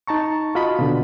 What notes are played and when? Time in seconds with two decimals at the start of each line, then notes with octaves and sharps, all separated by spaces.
0.07 D#4 A5 A#5 C#6
0.55 F4 F#4 D#5 B5
0.79 B2 D3